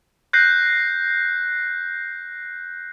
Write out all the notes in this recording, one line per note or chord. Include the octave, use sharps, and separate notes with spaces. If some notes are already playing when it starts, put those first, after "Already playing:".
F#6 G6 A#6 C7